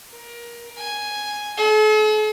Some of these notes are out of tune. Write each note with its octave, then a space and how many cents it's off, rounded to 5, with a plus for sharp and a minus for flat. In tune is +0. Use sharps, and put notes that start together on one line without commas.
A#4 +25
G#5 +0
A4 -45